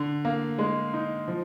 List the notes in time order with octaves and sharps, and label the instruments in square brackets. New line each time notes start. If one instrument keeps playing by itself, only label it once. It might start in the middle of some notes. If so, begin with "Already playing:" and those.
Already playing: [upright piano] D3
A#3
G#3
D#4
F3